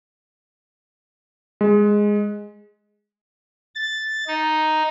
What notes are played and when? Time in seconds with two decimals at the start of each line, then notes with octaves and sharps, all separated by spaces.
1.61 G#3
3.75 A6
4.27 D#4